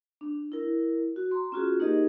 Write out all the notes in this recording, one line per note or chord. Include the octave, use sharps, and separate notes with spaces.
D4
E4 A#4
F#4
A#5 C6
C#4 F4 F#4 G#4
A#3 D#4 G4 G#4 A#4 D#5